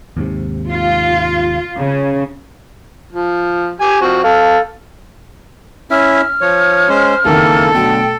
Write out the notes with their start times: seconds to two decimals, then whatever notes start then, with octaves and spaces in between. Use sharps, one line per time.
0.17 D#2 G#2 C3
0.71 F4
1.78 C#3
3.13 F3
3.81 G4 G#5
4.01 F3 C4 F#4
4.24 A4 F5
5.91 C#4 E4 E5 F6
6.41 F3 C#5
6.89 G#3 C#4 C5
7.25 F#1 F2 D#3 E3 A#3 A4
7.74 B2 D3 F#3 A3 G5